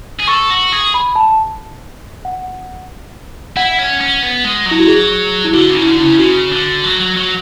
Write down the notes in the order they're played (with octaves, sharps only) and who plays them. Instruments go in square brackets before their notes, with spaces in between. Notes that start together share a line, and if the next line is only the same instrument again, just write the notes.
[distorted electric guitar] G#4
[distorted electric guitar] A4 [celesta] C#6
[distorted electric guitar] F#4
G#4
[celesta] B5
A5
F#5
[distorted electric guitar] E4 [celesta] F#5
[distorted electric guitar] C#4
C#4
B3
G#3
F#3
[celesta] E4
F#4
G#4
E4
[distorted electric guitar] D3 [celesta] F#4
[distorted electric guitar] C#3
[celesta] E4
[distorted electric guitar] D3
[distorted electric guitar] C#3 [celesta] E4
[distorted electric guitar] C#3 [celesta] F#4
[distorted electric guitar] D3
F#3
F#3
F#3